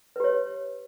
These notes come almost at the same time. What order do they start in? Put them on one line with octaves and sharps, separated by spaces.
B4 G4 C#5